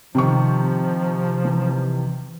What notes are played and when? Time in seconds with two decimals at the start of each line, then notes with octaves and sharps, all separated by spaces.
0.15 C3 D#3 F3 C#6
1.45 E3